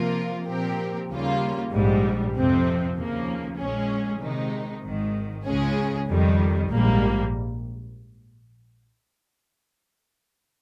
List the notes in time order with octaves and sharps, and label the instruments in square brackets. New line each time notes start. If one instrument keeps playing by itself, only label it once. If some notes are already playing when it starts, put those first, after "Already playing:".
Already playing: [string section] C3 F3 A#3 F4 A#4
A#2 F3 C4 G4 A#4
D#2 C#3 G3 A#3 F4
A#1 G#2 G3
F2 C3 F3 C4
D#2 C#3 F3 A#3
A#1 A#2 G#3 C#4 G#4
C3 D#3 G#3 D#4
G#1 G#2 D#3
C#2 C#3 G#3 C#4 G#4
F2 D#3 G3
A#1 G#2 G3 A#3